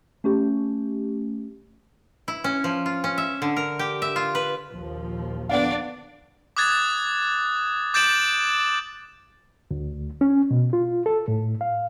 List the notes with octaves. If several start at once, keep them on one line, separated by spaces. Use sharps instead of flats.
A3 C#4 G4
E4
C#4
F3
F4
C#4
E5
D3
A#4
G4
E5
F4
B4
A#1 D#2 F3
D3 B3 D4 D5 F5 F#5
D6 D#6 F#6 G#6 A6
D6 G6 A6 D7 E7 F#7
D2
C#4
B2
F4
A4
A2
F5